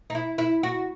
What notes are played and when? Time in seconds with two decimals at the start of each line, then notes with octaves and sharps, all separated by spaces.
0.10 D#4
0.15 E4
0.38 E4
0.63 F#4